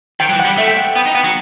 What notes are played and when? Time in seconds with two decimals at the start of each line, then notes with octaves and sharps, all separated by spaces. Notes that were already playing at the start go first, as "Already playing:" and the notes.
0.20 D#3 G5
0.29 F#3
0.33 E3
0.40 F#5
0.45 G3
0.57 A3 E5
0.68 G5
0.77 F#5
0.96 B3 G5
1.06 D#4
1.15 B3 F#5
1.24 F#3